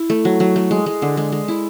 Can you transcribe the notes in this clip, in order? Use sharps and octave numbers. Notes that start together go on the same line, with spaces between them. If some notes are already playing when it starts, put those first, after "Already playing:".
Already playing: E4
A3
F#3
F#3
A3
G#3
G#3
D3
G#3
G#3
E4